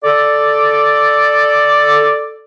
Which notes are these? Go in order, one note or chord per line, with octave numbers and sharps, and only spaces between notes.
A4 D5